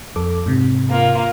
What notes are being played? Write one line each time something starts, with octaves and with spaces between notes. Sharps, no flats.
F2 A4 D6
G#2 C3
A#3 F4